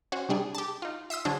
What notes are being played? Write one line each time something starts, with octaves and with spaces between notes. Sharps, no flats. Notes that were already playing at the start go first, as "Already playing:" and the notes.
C#4 F#4 C5
C3 G3 D4 G#4
G4 A5
D#4 F4
E5 C6 D#6 E6
D3 F#3 G#3 D4 G#4 C5